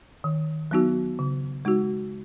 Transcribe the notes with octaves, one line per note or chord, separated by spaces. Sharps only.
D#3
F#3 B3 D#4 F#4
C#3
G#3 D#4 F#4